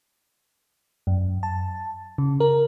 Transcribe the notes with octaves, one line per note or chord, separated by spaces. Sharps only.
F#2
A5
C#3
A#4